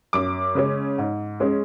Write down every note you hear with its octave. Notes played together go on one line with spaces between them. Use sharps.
F#2 D6
C#3 G#3 C#4
G#2
G#3 C#4